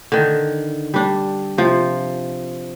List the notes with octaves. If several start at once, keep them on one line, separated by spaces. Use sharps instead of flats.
D3 D#3
G3 D4
C3 F3